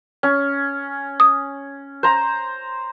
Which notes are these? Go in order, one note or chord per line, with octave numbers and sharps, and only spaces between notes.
C#4
D#6
C5 A#5